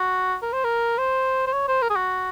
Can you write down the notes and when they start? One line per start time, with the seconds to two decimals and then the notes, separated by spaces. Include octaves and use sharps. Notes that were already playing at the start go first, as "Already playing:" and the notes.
Already playing: F#4
0.42 A#4
0.53 C5
0.64 A#4
0.98 C5
1.47 C5
1.53 C#5
1.68 C5
1.82 A#4
1.90 G#4
1.95 F#4